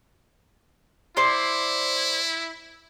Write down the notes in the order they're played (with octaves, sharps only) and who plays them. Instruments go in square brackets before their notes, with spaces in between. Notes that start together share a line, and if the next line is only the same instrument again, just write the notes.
[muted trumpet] E4 [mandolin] C5 D5 C6